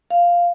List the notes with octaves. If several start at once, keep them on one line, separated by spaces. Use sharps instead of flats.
F5